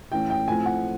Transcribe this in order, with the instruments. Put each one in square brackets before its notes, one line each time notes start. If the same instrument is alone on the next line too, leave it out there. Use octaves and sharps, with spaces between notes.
[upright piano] A2 E3 A3 C#4 G5
G5
A2 F3 A3 C4 G#5
F#5